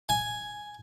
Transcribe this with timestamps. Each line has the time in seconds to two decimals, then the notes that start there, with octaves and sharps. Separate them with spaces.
0.09 G#5